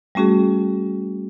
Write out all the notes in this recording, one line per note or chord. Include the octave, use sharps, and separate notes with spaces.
G3 A3 C#4 F#4 G#4